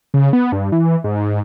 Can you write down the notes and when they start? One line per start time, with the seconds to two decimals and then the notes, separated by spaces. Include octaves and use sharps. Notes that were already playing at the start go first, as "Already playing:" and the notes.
0.14 C#3
0.33 B3
0.52 G2
0.72 E3
1.04 G#2